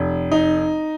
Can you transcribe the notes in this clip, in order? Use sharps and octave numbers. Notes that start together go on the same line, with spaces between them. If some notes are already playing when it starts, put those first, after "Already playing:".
Already playing: F1
D#4